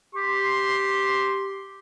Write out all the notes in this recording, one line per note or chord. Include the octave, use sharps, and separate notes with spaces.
G4 C6